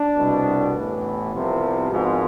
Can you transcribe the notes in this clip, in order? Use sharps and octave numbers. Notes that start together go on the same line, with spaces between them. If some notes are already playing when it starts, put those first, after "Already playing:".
Already playing: D4
C2 B2
A1 A2 E3 B3
C2 C3 F3
G#1 G#2 F3